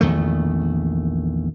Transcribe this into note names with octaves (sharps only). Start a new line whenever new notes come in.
A#1 E2 D#3 A3